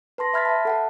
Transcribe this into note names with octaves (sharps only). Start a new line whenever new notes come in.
B4 A5 C6 A#6
E5 B5 F6 G#6 A6 B6
E5 A5
A4 F#5 A5